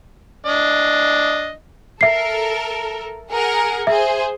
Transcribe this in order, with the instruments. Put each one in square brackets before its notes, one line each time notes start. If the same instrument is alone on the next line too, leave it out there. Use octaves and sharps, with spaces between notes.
[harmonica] D4 D#5
[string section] A4 A#4 [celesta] E5 C7
[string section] G#4 A#4 F#5
[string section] G#4 C5 [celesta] E5